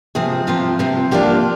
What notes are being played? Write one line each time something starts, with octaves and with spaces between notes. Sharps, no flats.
C3 F3 C4 G#4
C3 F3 C4 F4
C3 F3 C4
F3 A#3 D4 F4 G4